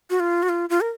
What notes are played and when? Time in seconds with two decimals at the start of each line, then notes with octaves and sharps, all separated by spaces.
0.10 F#4
0.20 F4
0.43 F#4
0.49 F4
0.70 F4
0.81 A#4